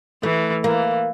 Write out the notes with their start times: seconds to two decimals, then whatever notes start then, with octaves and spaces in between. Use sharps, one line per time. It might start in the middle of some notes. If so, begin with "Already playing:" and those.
0.23 E3 A3
0.64 E3 A#3